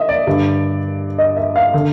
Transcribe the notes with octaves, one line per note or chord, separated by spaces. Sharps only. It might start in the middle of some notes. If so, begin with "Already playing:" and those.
Already playing: D#5 E5
D5
G2 D3
D#5
E5
F5
D3